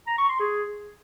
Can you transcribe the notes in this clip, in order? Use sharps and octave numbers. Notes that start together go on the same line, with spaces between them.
A#5
C#6
C6
G#4